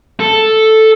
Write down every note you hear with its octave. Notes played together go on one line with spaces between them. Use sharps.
A4